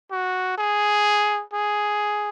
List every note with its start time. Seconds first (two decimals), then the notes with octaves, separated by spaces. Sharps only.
0.11 F#4
0.58 G#4
1.53 G#4